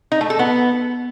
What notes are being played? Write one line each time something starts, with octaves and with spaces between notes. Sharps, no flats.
D#4
A3
A4
B3